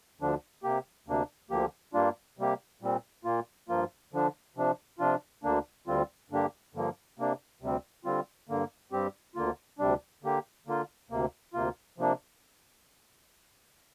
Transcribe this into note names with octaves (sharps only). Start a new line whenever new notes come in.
D2 D3 F3 D4
C3 A#3 G4
D2 C3 A#3 D4
D2 D3 F3 A#3 G4
G2 G3 A#3 D4 F4
C3 G3 A#3 G4
A#2 G3 C4
A#2 A#3 F4
G2 F3 A#3 F4
D3 F3 D4
C3 F3 D4
C3 F3 D4 F4
D2 D3 A#3 D4
D2 D3 G3 C4 F4
G2 D3 A#3 D4 G4
G2 D3 F3 A#3
C3 A#3 D4
D2 C3 G3 C4
D3 G3 C4 F4
G2 D3 A#3
G2 G3 C4 G4
D2 D3 A#3 F4
D2 C3 G3 D4
D3 A#3 G4
D3 A#3 F4
D2 C3 A#3
D2 C3 A#3 F4
C3 F3 A#3 D4